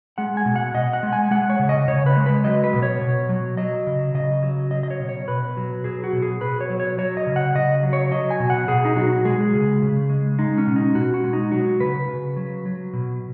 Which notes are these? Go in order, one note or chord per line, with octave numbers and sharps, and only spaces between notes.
G#3 F#5
G#5
B2
F#5
B2 D#5
F#5
G#3
G#5
G#3 F#5
C#5
C#3
D#5
C#3 C#5
B4
G#3
B4
F#3 D#5
B4
B2
C#5
B2
F#3
F#3 D#5
C#3
C#3 D#5
F#3
F#3 D#5
D#5
C#5
B2
C#5
B2 B4
F#3
F#3 G#4
F#4
B2
G#4
B2 B4
C#5
F#3
C#5
F#3 C#5
D#5
C#3
F#5
C#3 D#5
F#3
C#5
F#3 D#5
G#5
B2
F#5
B2 G#4
D#4
F#3 F#4
G#3 G#4
C#3
C#3
G#3
G#3 D#4
C#4
B2
D#4
B2 F#4
F#4
G#3
D#4
F#3 F#4
C#3 B4
C#3
F#3
F#3
B2